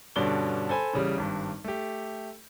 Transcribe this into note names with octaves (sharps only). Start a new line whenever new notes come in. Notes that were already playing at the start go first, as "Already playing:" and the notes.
G2 B2 D3 C#4 D5 G7
A4 C5 G#5 B5
A1 C#3 G3
G#1 G2
A3 G4